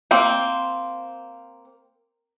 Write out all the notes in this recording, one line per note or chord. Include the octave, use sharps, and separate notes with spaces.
A#3 C4